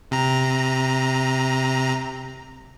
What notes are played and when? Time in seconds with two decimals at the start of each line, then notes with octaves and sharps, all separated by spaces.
0.11 C3 A#5